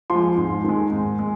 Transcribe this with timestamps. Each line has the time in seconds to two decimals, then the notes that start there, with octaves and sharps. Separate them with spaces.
0.10 F3 G#3 C6
0.37 G#2
0.64 D#3 G#3
0.92 G#2
1.19 G#3